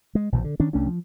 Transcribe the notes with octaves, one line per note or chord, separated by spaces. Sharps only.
G#3
A#1 B2 E3
D3
D#3 C#4 D4
C2 A3 C#4 D4
F3